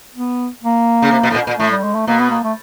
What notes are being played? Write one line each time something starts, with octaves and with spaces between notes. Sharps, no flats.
B3
A#3
C#3
C3
B2
A2
A#2
A#2
A2 A3
G3
G#3
A3
B2 A#3
B3
A#3
A3